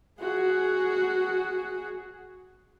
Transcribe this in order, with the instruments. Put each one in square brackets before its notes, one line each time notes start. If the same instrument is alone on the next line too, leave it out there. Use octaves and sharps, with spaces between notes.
[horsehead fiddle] F#4 G#4